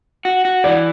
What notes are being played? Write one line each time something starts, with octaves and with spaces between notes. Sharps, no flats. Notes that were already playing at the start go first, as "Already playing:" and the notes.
F#4
F#4
E3 D5